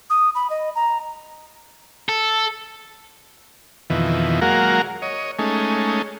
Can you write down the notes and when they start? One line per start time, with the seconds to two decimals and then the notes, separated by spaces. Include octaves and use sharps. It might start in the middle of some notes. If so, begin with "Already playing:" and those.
0.10 D#6
0.35 B5
0.50 D#5
0.75 A#5
2.09 A4
3.90 F2 B2 D#3 E3
4.42 F#3 G#3 A#3 F#4 A#4 F5
5.02 C#5 D#5
5.39 G#3 A3 C#4 D#4